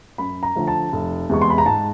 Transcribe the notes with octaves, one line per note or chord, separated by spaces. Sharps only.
F#2 B5
A#5
D3 F3 A3
A5
F1
E2 C3 E3 G#3 C#6
C6
B5
A#5
G#2 A5